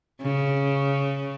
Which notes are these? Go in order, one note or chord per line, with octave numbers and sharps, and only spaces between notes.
C#3